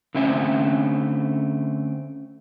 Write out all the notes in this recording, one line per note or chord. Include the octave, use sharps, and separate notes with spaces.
D3 A3 C4 C#4 E5